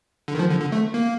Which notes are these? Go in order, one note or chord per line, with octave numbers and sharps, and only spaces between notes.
D3
D#3
F3
D3
D3
A3
A#3